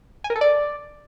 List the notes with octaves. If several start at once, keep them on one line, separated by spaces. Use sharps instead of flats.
G#5
A#4
A4
D5